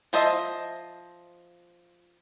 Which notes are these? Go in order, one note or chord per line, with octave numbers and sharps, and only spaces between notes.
F3 C5 D#5 E5